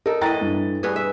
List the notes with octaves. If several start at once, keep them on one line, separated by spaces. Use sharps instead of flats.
D#4 A4 A#4
A2 E3 D#5 G5 A#5 A6
G2
G2 B3 G#4 B4
E5